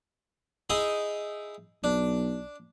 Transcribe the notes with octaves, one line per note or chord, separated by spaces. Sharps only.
D#4 E4 G#4
B1 D4